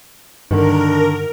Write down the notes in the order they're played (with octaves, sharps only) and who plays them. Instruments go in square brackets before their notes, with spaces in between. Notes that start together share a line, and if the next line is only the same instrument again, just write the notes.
[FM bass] G2 [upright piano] D3 D#3 [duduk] D4 [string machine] A#4